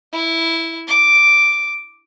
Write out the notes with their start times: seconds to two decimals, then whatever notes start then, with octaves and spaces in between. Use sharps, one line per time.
0.13 E4
0.88 D6